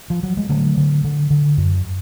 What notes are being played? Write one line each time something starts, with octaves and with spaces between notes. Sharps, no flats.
F3
F#3
G#3
D3 F#3 A3
D3
D3
D3
F#2